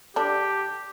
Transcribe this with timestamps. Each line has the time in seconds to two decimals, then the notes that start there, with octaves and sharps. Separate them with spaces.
0.16 D3 D4 G4